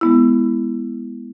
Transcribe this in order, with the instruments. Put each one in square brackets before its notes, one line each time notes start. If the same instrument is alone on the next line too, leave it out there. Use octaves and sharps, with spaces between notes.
[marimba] G#3 B3 E4